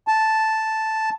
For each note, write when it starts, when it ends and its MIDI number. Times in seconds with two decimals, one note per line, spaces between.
0.08 1.10 81